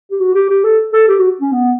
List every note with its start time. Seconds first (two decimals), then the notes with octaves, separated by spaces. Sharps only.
0.11 G4
0.20 F#4
0.35 G4
0.49 G4
0.64 A4
0.93 A4
1.08 G4
1.19 F#4
1.41 C#4
1.52 B3